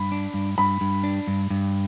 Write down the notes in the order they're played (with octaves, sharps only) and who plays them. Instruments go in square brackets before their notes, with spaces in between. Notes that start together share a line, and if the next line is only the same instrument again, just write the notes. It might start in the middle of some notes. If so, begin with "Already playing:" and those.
Already playing: [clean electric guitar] G2 [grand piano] B5
[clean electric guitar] D4
G2
[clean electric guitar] G2 [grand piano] B5
[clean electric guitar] G2
D4
G2
G2